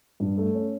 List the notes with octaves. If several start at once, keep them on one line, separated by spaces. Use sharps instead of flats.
G2
A3
C#4